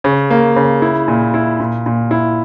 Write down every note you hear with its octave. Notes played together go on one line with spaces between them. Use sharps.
C#3
A#3
C#3
E4
A#2
E4
A#2
A#2
E4